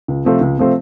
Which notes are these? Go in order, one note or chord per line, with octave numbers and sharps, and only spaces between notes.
C#2
C3 F3 A3 C4
C#2
C3 F3 A3 C4